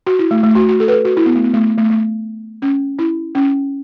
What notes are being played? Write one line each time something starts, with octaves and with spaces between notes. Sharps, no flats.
F#4
E4
A3
A3
F#4
F#4
A4
B4
A4
F#4
E4
B3
A3
B3
A3
A3
A3
C#4
E4
C#4